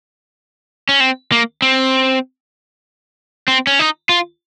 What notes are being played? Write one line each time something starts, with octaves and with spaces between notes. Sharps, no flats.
C#4
C4
A#3
C4
C4
C#4
D#4
F4